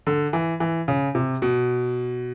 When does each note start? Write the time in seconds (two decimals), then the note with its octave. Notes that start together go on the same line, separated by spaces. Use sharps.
0.07 D3
0.33 E3
0.60 E3
0.88 C#3
1.15 C3
1.42 B2